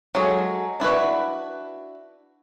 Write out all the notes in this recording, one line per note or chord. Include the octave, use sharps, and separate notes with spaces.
F#3 G#3 G#4 A4
D4 E4 F#4 B4